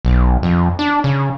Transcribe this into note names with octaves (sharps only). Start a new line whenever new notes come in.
B1
F2
D4
C#3